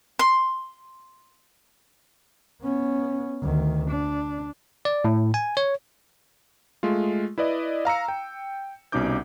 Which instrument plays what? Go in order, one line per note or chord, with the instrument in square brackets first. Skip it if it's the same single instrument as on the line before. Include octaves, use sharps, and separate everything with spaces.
[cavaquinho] C6
[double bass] B3 C#4
D2 D#3
D4
[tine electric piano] D5
A2
G#5
C#5
[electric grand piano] G#3 A3 F4
E4 B4 D5 D#5
F5 A#5 E6 C#7
G5
C2 B2 C#4 D#4 D6 G6